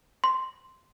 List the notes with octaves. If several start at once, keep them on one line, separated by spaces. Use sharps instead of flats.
C6